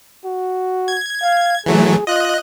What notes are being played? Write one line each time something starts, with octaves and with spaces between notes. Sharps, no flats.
F#4
G#6
F5
E3 F#3 A3 G#4
F4 D#5 F#6